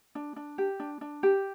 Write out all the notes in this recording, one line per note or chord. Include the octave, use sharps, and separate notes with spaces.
D4
D4
G4
D4
D4
G4